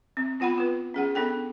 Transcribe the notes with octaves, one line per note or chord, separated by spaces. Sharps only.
C4
B3 F4 F#5 G5 B5
F4 B4
C#4 G#4 F#5
B3 D4 A4 G5